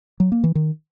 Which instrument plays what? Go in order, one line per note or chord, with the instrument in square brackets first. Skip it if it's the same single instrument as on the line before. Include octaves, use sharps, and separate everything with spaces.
[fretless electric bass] F#3
A#3
E3
D#3